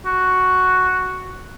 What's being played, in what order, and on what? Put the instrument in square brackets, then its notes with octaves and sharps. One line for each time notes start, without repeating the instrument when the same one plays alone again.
[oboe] F#4